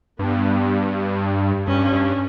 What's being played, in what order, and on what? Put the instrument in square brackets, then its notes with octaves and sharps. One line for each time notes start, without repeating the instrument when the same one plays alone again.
[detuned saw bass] G2 [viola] B3
[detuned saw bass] G2 [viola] C#4
[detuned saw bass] G2